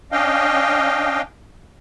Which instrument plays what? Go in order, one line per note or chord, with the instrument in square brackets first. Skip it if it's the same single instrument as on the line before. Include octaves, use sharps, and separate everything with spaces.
[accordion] C#4 D4 D#5 F5 G5